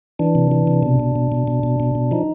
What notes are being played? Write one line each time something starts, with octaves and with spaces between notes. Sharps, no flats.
E3 D4
C3
E3
C3
B2
B2
B2
B2
B2
B2
B2
B2
F3 D#4